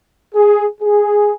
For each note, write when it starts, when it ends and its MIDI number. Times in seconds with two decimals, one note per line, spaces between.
0.35 0.65 68
0.81 1.33 68